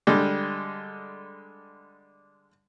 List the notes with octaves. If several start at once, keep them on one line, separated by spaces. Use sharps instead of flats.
D3 G3 G#3